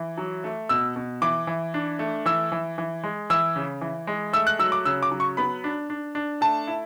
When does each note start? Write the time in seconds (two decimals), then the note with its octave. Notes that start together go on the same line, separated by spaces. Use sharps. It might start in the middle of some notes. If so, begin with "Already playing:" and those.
Already playing: E3
0.18 F#3
0.44 A3
0.69 B2 E6
0.96 B2
1.22 E3 D6
1.47 E3
1.74 D4
1.99 A3
2.26 E3 E6
2.52 E3
2.78 E3
3.04 G#3
3.30 E3 E6
3.56 C#3
3.81 E3
4.07 G#3
4.33 A3 E6
4.47 F#6
4.59 F#3 E6
4.72 D6
4.85 C#3 E6
5.03 D6
5.11 F#3
5.20 C#6
5.37 B3 B5
5.64 D4
5.90 D4
6.15 D4
6.41 A3 A5
6.67 E4